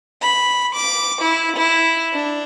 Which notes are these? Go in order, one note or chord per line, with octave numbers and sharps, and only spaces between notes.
B5
D6
E4
E4
D4